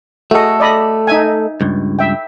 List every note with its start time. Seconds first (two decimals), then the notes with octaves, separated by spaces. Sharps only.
0.31 A3 F#4 G#4 A4 D#5
0.60 D5 D#5 B5
1.07 D#4 E5 G#5
1.61 C#2 G2
1.99 E5 G5